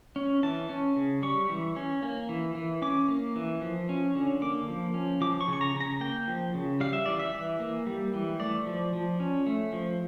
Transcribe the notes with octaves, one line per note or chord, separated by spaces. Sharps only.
C#4
E3 A5
C#4
C#3
G3 C#6
E3
C#4
A#3
E3
E3
C#4 D6
A#3
E3
F3
C#4
D3
A#3 D6
F3
C#4
F3 D6
C#6
C#3
C#6
A#5
C#3
A#5
A#3 G5
F3
C#3
G3 F5
E5
E3 D5
E5
E3
A#3
G3
E3
A3 D5
F3
F3
C#4
A3
F3